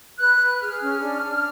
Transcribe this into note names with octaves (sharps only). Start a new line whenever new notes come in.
B4 F#6
B4
F#6
G#4 F6
C#4
D4
D4